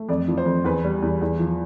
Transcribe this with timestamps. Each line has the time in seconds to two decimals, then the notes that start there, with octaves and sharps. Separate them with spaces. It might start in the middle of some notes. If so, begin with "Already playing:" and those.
Already playing: A3
0.09 F2 D5
0.28 F3
0.37 C5
0.46 F2
0.64 E2 B4
0.84 G3
1.02 E2
1.21 E2
1.39 F3